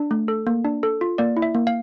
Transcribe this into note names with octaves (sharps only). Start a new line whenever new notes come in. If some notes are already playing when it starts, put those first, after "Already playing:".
Already playing: D4
A3
A4
A#3
D4
A4
F4
A#3 D5
E4
E5
A#3
F5